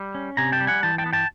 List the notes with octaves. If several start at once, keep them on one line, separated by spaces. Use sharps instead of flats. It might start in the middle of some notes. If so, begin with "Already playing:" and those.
Already playing: G3
C#4
C3 G#5 A#5
G5 A5
G3
F#5 G#5
E3 G5 A5
G5 A5
B3
G5 A5